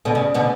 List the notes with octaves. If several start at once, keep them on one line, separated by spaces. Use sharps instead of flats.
B2 D3
C#3
B2 D3